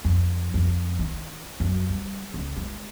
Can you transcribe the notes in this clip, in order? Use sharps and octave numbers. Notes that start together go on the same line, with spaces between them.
F2
F2
D#3
F#2
G3
C#2
G#3